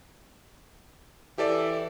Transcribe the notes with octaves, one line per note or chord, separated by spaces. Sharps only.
E3 G4 A4 D5